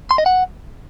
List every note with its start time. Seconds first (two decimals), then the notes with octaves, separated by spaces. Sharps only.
0.11 C6
0.18 D#5
0.26 F#5